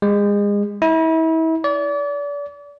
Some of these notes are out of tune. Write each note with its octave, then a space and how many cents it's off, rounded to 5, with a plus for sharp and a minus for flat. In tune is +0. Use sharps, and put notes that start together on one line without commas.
G#3 -30
E4 -35
D5 -35